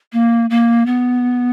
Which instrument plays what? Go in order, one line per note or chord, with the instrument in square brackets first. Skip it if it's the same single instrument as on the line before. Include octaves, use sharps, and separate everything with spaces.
[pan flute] A#3
A#3
B3